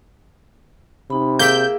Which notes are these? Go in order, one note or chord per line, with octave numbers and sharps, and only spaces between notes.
C3 D#4 B5
A#3 E4 G#4 G5 G6